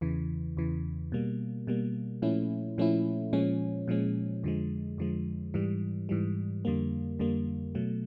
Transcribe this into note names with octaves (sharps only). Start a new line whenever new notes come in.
E2 C#3 E3
E2 C#3 E3
B2 G3 A#3
B2 G3 A#3
A#2 F3 A3 C#4 E4
A#2 F3 A3 C#4 E4
A#2 F3 G#3 C#4
A#2 F3 G#3 C#4
F2 D3 F3 G#3
F2 D3 F3 G#3
G#2 E3 G3
G#2 E3 G3
F2 D3 G3 A#3
F2 D3 G3 A#3
B2 F#3 A3